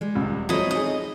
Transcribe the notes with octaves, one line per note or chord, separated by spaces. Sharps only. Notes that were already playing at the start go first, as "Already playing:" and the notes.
G3 G#3
D#1 C#2
F3 F#3 C4 E4 A4 C#5 D#5
D#4 G#4 D#5